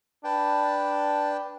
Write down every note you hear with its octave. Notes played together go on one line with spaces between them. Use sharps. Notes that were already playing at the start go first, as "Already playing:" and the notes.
D4 B4 G5 A5